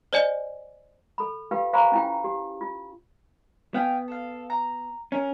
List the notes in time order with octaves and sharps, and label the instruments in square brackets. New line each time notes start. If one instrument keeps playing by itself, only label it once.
[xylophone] C5 D5 D#5 G#5
[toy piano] A4 B5
F4 G4 B4 F5 G5
C5 F5 G#5 A#5 B5 C#6
C#4 E4 F4 G5
G4
F4
[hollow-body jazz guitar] B3 [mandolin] F5 G5 G#5
[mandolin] A4 F5
A#5
[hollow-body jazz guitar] C#4 [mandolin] A#4